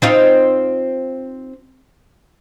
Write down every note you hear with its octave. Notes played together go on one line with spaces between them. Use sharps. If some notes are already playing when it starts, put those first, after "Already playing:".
C4 D#4 F4